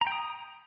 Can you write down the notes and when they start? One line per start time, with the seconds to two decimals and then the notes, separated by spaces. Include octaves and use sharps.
0.01 A#5
0.07 G5
0.12 D#6